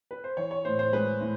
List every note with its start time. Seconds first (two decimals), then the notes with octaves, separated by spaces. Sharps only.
0.11 B4
0.24 C5
0.37 E3 C#5
0.51 C#5
0.65 A2 C5
0.79 C5
0.93 G#3 B4
1.21 A2